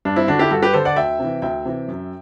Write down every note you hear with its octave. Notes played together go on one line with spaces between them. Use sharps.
G2 D4
C4 E4
D3 D4 F#4
E4 G4
G2 F#4 A4
G4 B4
D3 A4 C5
D5 F#5
D2 E5 G5
C3 E3
D2 E5 G5
C3 E3
F#2